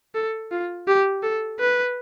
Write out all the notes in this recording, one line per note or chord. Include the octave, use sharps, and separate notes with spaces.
A4
F4
G4
A4
B4